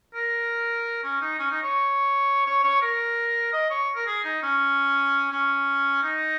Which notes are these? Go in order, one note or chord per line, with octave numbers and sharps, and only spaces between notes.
A#4
C#4
D#4
C#4
D#4
C#5
C#5
C#5
A#4
D#5
C#5
A#4
G#4
D#4
C#4
C#4
D#4